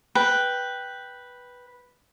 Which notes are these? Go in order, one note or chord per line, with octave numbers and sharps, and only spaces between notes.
B4 G5